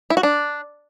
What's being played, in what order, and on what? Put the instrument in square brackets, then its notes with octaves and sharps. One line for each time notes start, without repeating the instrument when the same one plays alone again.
[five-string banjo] E4
F#4
D4